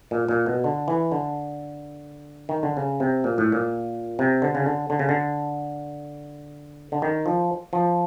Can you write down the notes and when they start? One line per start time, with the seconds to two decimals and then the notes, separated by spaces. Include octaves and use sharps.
0.11 A#2
0.29 A#2
0.46 B2
0.64 D3
0.88 E3
1.12 D3
2.49 D#3
2.63 D3
2.77 C#3
3.00 C3
3.24 A#2
3.38 A2
3.52 A#2
4.19 C3
4.42 D3
4.55 C#3
4.66 D3
4.90 D3
4.99 C#3
5.09 D3
6.92 D3
7.02 D#3
7.26 F3
7.73 F3